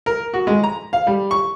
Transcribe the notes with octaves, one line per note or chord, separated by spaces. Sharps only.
A#4
F#4
G#3
A#5
F5
G3
C#6